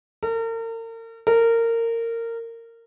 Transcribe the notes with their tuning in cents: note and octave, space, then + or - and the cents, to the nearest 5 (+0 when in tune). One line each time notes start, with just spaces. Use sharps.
A#4 -40
A#4 -20